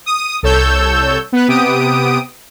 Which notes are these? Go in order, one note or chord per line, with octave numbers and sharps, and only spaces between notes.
D#6
C2 A4 C#5 E6 G6
B3 B4
C3 B3 G4 D#6 D7